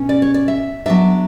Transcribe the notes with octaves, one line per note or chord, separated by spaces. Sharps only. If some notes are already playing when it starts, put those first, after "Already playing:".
Already playing: B2 C#4
D5
C#5
D5
E5
F#3 B3 D4 E5